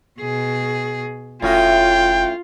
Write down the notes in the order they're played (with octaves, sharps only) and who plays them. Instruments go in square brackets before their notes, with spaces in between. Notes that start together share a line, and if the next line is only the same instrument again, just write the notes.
[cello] B2 G#4
[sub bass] F1 [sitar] A2 C#4 F#4 [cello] F4 [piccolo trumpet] G5